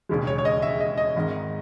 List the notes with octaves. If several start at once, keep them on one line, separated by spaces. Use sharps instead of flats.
E1 D#2 C#3 G#3
C#5
C#5
D#5
E5
D#5
D#5
G#1 G#2 D#3